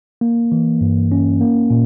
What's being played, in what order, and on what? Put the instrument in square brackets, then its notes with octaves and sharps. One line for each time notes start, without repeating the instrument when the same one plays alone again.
[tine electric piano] A#3
E3
G2
C#4
A#3
A#2